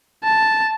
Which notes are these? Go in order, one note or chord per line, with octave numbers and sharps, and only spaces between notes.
A5